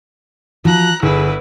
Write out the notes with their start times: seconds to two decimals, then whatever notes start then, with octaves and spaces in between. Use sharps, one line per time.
0.65 F3 F#4 A#5 F#6
1.02 G1 E4 G#4 B4